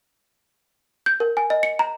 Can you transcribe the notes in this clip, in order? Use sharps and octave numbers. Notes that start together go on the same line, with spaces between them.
G6
A#4
G#5
D#5
C#7
A#5